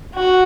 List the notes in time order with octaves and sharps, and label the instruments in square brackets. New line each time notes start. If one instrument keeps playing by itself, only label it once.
[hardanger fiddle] F#4